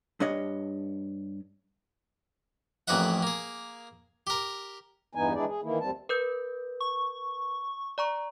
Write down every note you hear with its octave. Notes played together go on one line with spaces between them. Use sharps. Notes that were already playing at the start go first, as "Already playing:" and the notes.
G2 D4 C#5 D#5
A1 F2 A#3 B4 E5 F#5
A#3 G#4
G4 A#4
E2 G2 E3 B3 D#4 G#5
E3 G#3 D4 E4 G#4 D5
G#4
D#3 E3 A#3 E4
D2 G3 C4 A5
A#4 B4 G6
C#6
D5 A#5 C#6